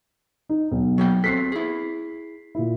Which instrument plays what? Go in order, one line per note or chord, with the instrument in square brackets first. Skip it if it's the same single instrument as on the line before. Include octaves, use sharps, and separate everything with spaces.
[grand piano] D#4
B1
[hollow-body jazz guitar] F#3 A#3 G5
[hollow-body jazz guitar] C4 F#4 A4 [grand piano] B6 C7
[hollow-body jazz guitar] E4 G#4
[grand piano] A#2 E4